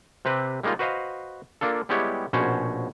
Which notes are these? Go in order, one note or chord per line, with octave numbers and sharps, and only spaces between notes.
C3 C4 G4 B4
G3 G#3 A#3 D#4 F4
F#4 B4 C5 D#5 F5
A#3 D4 F4 A4
G3 G#3 B3 E4 G4 C#5
A#1 B2 C#4 F#4 C5 G#5